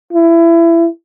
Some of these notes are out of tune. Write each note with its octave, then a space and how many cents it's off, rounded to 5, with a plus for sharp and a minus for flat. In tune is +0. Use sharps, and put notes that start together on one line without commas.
E4 +25